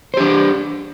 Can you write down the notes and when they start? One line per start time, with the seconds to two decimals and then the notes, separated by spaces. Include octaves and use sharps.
0.14 C5
0.17 G4
0.20 D4